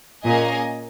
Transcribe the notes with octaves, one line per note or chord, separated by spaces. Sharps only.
A#2 A#3 C#4 G#4 D#5 G#5